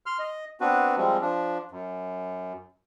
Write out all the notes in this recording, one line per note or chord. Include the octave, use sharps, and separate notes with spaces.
C6 F6
D#5
B3 C4 D4 F#4 B4
F3 G3 G#3 C4
F3 D4
F#2